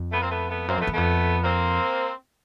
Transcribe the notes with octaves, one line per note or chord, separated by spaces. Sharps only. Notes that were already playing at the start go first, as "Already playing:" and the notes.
Already playing: F2
A3 B3
A#3 C4
A3 B3
A3 B3
F#2 A#3 C4
F2 A3 B3
E2
F2 A3 B3
A#3 C4